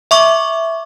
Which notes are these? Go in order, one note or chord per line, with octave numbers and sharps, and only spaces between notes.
E5 C#6 D6